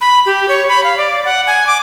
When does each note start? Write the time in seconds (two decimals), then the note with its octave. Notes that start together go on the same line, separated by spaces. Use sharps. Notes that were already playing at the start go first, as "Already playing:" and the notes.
0.01 B5
0.26 G4
0.49 C#5
0.69 B5
0.84 F5
0.98 D5
1.25 F#5
1.47 G#5
1.67 D6